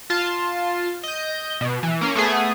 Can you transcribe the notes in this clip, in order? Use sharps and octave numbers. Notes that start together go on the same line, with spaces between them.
F4 A5 C6
D#5 G6
B2
E3
A#3 C#4
A3 B3 G#4